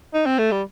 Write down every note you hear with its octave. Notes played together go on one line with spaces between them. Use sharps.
D#4
C4
A3
G3